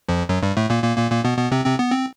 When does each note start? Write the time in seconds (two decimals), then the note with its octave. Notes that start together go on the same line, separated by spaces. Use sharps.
0.09 F2 F3
0.29 F#2 F#3
0.42 G2 G3
0.57 A2 A3
0.70 A#2 A#3
0.83 A#2 A#3
0.97 A#2 A#3
1.11 A#2 A#3
1.24 B2 B3
1.38 B2 B3
1.52 C3 C4
1.65 C3 C4
1.79 B3
1.92 C4